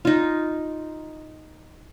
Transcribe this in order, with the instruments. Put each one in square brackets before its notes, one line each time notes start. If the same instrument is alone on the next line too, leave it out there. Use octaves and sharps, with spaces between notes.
[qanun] D#4 F4